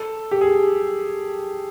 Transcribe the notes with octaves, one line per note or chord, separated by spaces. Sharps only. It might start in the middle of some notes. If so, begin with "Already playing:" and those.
Already playing: A4
G4
G#4